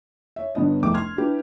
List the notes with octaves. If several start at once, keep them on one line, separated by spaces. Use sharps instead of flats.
C#5 E5
G1 G2 B3 C#4 D#5
F1 C2 G#3 A3 G5 D6
C6 F6 G#6
D4 E4 G4 B4